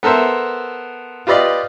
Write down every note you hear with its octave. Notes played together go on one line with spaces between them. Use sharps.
B3 A4 A#4 C5 E5
F4 G4 B4 D5 D#5 F5